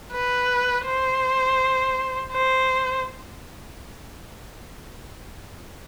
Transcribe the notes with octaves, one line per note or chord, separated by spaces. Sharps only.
B4
C5
C5